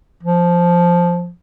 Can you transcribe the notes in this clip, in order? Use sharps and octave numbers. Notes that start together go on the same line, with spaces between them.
F3